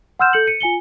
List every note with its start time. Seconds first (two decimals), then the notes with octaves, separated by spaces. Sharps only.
0.19 F#5 C6 E6 F6 G6 E7
0.33 A4 G6 C#7 F#7
0.47 C#7 D#7
0.61 F4 G#5 C#7 G7